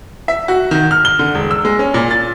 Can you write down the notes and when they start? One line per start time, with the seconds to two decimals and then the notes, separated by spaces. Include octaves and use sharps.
0.28 E5
0.48 F#4
0.71 D#3
0.91 F6
1.05 G7
1.19 D3
1.35 E1
1.51 E6
1.65 G#3
1.79 C#4
1.94 A#2
2.11 A6